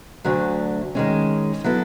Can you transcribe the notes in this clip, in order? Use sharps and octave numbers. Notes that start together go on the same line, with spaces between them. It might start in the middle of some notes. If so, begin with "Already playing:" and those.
D2 D3 F#3 A3
D#3 G#3 C#4
F#3 B3 E4 A4